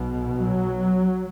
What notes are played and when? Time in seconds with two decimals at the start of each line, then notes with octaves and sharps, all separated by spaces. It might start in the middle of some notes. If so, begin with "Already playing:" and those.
Already playing: B1 B2
0.36 F#3